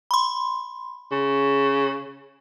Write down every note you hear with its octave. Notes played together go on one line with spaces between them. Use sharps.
B5 C6
C#3